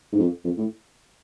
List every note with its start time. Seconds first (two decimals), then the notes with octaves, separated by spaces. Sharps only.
0.12 G#2
0.19 F2
0.44 F2
0.57 A2